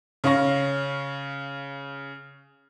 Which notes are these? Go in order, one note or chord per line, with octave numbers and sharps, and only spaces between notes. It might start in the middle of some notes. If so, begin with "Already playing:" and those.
C#3 C#4 F5 C#6 A#6